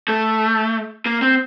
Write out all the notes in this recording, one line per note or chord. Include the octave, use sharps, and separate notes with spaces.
A3
A#3
C4